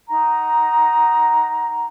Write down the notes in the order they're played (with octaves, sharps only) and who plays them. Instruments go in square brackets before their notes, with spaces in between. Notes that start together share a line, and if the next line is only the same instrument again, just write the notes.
[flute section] D#4 F#5 A#5